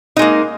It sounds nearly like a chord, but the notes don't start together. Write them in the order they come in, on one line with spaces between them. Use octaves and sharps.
D#4 G#3 A#3